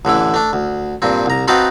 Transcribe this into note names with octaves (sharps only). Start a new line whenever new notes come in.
A1 D3 E3 E4
A3 D4
D2
G2 A#2 C4
C2 A#5
C4 D#4 F#4 B4 F5 A5